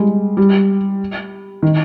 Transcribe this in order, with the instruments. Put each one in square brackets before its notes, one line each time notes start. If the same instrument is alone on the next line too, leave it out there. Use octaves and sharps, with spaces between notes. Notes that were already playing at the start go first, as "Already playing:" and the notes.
Already playing: [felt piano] G3 G#3
G3
D#3